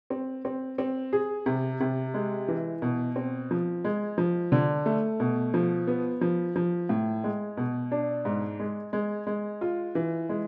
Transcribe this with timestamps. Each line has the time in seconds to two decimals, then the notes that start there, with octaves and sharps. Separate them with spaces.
0.10 C4
0.45 C4
0.78 C4
1.13 G#4
1.46 C3
1.80 C3
2.14 G#3
2.48 E3
2.82 B2
3.16 C4
3.51 F3
3.85 G#3
4.18 F3
4.52 D3
4.86 A3
5.20 B2
5.54 F3
5.87 B3
6.21 F3
6.56 F3
6.89 A2
7.24 G#3
7.57 B2
7.91 D4
8.25 G#2
8.60 G#3
8.93 G#3
9.27 G#3
9.61 F4
9.95 E3
10.29 G#3